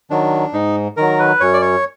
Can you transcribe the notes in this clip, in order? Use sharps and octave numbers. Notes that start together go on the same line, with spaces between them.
D#3 F#3 D4
G#2 D#4
D#3 F#3 A#4
B4
F#2 C#5
D5
C#5